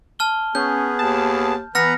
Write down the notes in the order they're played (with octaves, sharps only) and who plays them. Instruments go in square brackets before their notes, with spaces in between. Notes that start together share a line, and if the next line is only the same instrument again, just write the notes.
[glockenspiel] A5 F6 G7
[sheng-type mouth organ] B3 G#4 [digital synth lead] C#4 [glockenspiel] G6
[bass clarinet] D#2 [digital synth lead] A5
[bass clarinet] E3 [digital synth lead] B3 [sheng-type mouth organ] B4 A#5 [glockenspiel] F6 A#6 C#7